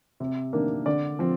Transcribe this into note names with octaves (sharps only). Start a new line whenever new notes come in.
C3
D#3 A#3 D4
D3 D5
F3 C4